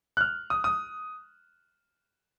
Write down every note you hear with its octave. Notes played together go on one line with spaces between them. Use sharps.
F#6
F6
D#6
D#6